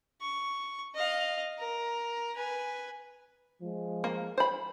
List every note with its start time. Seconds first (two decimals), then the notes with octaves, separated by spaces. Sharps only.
0.21 C#6
0.94 D#5 F5
1.58 A#4
2.36 B4 G#5
3.62 F3 G#3
4.04 A#3
4.38 C5 B5